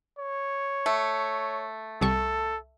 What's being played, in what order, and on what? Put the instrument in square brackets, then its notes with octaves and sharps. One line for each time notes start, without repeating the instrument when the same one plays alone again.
[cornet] C#5
[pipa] A3
[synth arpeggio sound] C2 G3 C#6 [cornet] A4